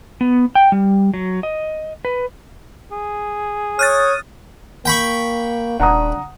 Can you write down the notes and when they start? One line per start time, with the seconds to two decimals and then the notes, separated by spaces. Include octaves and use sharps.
0.21 B3
0.55 G5
0.72 G3
1.14 F#3
1.43 D#5
2.05 B4
2.92 G#4
3.79 C#5 D#6 F6 F#6 A6
4.85 A#3 G5 B5 C#6
5.80 D#1 D4 F#5 A#5 D#6